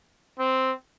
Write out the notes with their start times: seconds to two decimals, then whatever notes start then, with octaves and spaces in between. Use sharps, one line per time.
0.39 C4